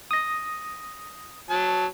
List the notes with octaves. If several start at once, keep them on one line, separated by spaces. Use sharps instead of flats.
D#6 A#6
F#3 A5